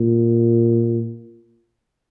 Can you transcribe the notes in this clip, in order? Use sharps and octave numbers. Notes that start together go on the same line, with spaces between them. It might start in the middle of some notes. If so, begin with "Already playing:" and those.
Already playing: A#2